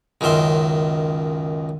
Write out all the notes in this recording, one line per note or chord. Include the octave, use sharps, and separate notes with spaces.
C#2 F#2 D#3 E5 C6